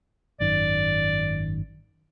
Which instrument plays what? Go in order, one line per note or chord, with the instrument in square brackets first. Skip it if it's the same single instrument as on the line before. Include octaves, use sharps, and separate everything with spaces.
[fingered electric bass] G#1 F#2 D#3 [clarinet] D5